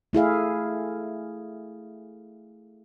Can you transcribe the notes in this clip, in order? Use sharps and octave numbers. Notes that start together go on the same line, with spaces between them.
A3 E4 G#4 F5